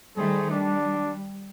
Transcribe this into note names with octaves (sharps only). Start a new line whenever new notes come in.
D#3 G3 A3 G#4 C5
G3 D4